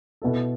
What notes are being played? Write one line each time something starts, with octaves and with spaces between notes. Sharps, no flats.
B2 B3 E4 A4